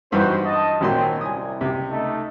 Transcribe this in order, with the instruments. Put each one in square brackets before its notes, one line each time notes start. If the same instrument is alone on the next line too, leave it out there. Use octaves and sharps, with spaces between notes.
[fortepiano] G2 E3 [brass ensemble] D#4 F#4 C5
[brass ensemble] D#5 A5
[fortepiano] G#1 A#2 C6 [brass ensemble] F#3 C4
[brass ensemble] C2 [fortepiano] G#5 D#6
[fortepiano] C#2 C3
[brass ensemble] A3 D#4 A4